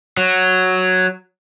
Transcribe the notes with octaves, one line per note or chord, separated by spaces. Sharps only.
F#3